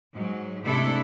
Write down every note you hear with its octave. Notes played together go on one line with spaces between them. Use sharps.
G#2 F#3
G#2 C3 A3 D4 E4 A4